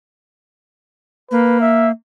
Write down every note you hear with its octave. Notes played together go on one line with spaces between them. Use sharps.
A#3 B4
E5